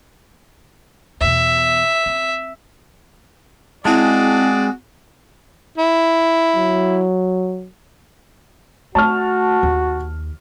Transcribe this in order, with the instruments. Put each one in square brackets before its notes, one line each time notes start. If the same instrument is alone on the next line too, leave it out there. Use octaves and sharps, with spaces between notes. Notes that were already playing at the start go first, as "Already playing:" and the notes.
[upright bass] E2 B2 [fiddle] E5
[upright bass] C4
[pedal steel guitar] G#3 [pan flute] C4 [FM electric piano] E4 A5 [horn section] F#4 G#4 D5
[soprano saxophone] E4
[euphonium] F#3
[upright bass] A3 [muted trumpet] F#4 [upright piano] A5 C#6 F6
[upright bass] D#2